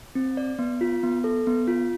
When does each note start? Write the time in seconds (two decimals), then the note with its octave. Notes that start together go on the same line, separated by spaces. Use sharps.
0.15 C4
0.37 D5
0.59 B3
0.81 F4
1.03 B3
1.24 A4
1.47 B3
1.68 F4